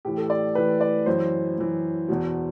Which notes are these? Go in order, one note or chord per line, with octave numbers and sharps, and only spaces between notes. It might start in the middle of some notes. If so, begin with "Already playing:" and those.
A2 E3 G4
A4
D5
A2 E3 B4
D5
F#2 E3 C5
F#2 E3
E2 B2